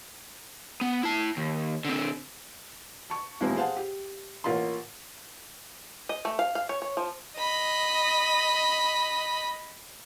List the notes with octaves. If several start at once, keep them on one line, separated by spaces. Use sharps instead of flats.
B3
E4 A5
D#2
D3 C4
A5 C#6
D#2 A#2 E3 G#3 B3 C4
G#4 C5 F5 F#5 A5
G4
A1 A#3 F4 C6
D#5
A3
F5
F5
C#5
C#5
F3
D#5 B5